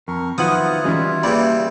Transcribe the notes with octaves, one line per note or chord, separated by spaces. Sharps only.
F2 A#4 C#6
D#3 F3 F#3 B3 E4 F4 F#5 D#6
E3 G3 G#3 C#4 F#4
C#3 E3 G3 A#3 D5 B5